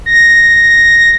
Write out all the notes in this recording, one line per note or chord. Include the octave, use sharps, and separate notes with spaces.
A#6